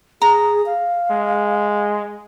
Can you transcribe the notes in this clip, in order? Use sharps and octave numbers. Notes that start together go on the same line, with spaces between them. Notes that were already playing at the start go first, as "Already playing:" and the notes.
G#4 A#5
F5
G#3